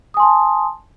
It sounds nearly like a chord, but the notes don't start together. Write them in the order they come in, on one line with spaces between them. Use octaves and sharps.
D#6 G#5 C6 A5